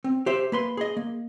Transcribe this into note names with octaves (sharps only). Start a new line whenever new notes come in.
C4
G4 C5 E5
A#3 B4 C6
G#4 D#5
A#3